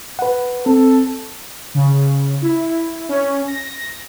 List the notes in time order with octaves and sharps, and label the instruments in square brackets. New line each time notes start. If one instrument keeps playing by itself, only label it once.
[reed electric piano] B4 F#5
[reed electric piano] C4 [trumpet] A4
[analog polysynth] C#3
E4
C#4
A#6